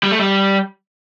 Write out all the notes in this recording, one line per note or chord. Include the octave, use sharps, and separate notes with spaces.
G3
A3
G3